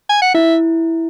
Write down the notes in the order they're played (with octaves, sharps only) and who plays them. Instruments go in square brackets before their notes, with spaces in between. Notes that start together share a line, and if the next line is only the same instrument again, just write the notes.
[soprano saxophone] G#5
F#5
[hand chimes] E4 [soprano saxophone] E5